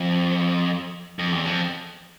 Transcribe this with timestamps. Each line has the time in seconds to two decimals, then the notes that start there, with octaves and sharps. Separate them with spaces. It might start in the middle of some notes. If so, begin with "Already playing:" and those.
Already playing: F2
1.19 F2
1.32 E2
1.45 F2